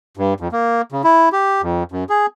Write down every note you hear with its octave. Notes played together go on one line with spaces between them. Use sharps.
G2
F2
A#3
C#3
E4
G4
F2
F#2
G#4